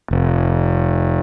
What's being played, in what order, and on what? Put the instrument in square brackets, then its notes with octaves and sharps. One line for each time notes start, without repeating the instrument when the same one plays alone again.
[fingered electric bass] F1